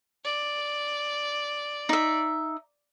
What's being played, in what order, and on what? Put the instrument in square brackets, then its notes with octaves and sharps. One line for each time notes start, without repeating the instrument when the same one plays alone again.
[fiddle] D5
[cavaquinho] D#4 E5